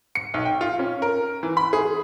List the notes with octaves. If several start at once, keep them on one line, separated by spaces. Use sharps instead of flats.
C#7
B1
G5
F4
C#4
A#4
E3
B5
G#4